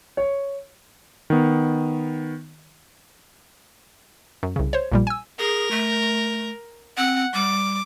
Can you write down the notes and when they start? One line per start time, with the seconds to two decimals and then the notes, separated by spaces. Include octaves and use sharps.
0.17 C#5
1.30 D#3 B3
4.43 F#2
4.56 C2 C#3
4.73 C5 C#5
4.92 A#1 A#2 G3
5.07 G#5 E6
5.39 G#4 A#4
5.71 A3
6.97 C4 F#5
7.34 G3 D6